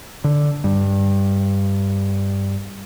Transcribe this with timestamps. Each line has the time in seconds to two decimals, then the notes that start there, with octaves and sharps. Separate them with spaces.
0.24 D3
0.64 G2